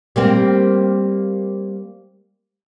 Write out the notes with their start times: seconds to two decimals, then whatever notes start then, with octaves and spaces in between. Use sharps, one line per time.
0.16 G3 A#3 C4